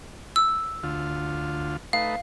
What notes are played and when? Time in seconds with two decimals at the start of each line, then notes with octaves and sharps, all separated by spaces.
0.36 E6
0.83 D2 F4
1.93 A3 D#4 B4 F5